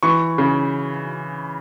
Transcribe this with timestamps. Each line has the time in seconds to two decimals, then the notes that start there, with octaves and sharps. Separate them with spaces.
0.03 E3 C#6
0.38 C#3